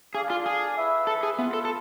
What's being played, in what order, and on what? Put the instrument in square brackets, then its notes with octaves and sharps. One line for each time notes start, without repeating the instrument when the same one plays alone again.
[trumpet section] D4 A4 D5 F5 [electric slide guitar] G#4
[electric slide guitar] F4
G#4
[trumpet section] E4 B4 E5
[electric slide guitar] A4
G#4
[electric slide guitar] B3 [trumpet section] F4 B4 E5
[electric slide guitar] A4
A4